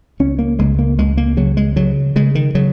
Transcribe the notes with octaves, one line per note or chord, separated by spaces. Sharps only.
C#2 C#4
A#3
C#2 G#3
A#3
C#2 G#3
A#3
C#3 F#3
G#3
C#3 F#3
C#3 G#3
D#3
C#3 F#3